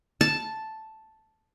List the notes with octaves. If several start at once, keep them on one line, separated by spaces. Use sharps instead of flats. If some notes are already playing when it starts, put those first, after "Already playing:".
A5